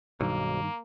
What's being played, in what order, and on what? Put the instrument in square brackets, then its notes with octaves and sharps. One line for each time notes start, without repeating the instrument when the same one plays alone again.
[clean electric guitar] B1 [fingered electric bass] G2 D#3 [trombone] A#3